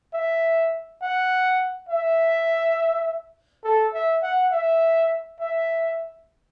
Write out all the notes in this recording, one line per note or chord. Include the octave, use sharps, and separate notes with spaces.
E5
F#5
E5
A4
E5
F#5
E5
E5